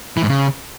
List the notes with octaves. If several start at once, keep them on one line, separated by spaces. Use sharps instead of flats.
E3
G#2
C#3